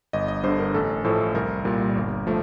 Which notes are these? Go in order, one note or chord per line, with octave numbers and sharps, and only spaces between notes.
G1 D#5
D#5
G2 D3 C5
A#4
A1 A4
A2 F3 A3 A4
C2 A#4
A#2 G3
G1
F3 A3